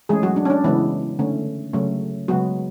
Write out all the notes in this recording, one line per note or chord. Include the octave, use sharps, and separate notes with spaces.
E3 G#3 A3 C#4 G#4
F#3 F#4
D4
C#4
D4
C#3 E3 G#3 B3 E4
D3 A3 C#4
C#3 F#3 A3 C#4
C#3 F#3 G#3 B3 F#4